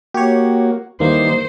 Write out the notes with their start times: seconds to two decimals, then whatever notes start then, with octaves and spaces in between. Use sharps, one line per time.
0.14 A#3 F#4 G4 C#5
1.00 D#2 E3 G3 A#3 D#4 C5